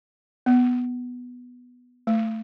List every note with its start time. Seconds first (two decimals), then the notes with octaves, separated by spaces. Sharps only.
0.46 B3
2.07 A3